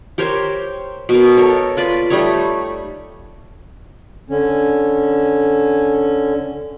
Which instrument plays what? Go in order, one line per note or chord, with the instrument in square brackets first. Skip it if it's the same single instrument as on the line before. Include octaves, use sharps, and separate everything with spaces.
[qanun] G4 A#4 C5 C#5
B2 A#4
A4 A#4 C#5
F4 B4 D5
G3 A3 D#4 C#5
[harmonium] D3 C#4